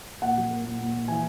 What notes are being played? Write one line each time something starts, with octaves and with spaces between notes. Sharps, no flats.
A#2 F#5
F#3
A#3
A#2
A#2
A#2
E3 G#5